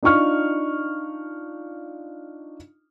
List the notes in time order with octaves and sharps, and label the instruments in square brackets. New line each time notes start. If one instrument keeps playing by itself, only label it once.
[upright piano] D4 D#4 F4 C#6 F6